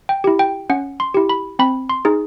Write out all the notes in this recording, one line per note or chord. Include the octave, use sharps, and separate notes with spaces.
G5
E4 G4
G5
C#4 F#5
C6
E4 G4
B5
C4 B5
C6
D#4 G#4